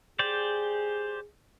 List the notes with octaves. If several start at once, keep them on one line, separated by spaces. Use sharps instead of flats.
G4 G#4 C5 D5